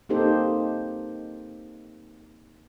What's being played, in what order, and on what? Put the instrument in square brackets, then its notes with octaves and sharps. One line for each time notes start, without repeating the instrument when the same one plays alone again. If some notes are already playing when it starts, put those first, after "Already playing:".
[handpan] A#3 C4 D#4 G4 A4 C5